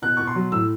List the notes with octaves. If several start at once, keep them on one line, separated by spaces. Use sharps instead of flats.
B2 F#6
B2 C#6
C6
F#3
A2 E6